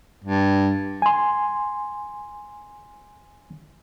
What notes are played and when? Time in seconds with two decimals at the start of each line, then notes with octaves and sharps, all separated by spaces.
0.24 G2
1.02 G#5 C6